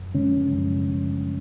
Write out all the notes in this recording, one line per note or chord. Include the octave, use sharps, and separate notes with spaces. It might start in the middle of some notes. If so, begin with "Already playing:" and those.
Already playing: F#2
C#3 G#3 C#4
F#2